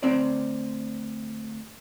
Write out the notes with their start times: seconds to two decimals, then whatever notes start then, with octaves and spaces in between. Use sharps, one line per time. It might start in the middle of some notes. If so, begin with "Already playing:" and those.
0.03 D2 C4 D5